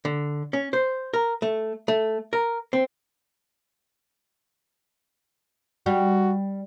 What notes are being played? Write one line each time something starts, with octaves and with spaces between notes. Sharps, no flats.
D3
C#4
C5
A#4
A3
A3
A#4
C4
G3 F#4